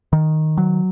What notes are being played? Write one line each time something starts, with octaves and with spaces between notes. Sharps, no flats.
D#3
F#3